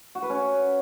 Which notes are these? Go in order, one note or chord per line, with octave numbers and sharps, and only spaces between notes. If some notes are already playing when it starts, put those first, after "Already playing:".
F#4
B4
C#4